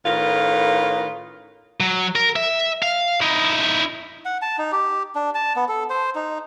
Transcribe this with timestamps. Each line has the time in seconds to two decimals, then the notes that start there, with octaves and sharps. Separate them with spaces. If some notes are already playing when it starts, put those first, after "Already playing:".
0.05 A2 D#3 C#4 F4 A#4 B4
1.80 F#3
2.15 A#4
2.36 E5
2.82 F5
3.21 D#4 E4
4.25 F#5
4.42 A5
4.58 D#4
4.72 G4
5.15 D4
5.35 A5
5.56 B3
5.69 A4
5.90 C5
6.15 D#4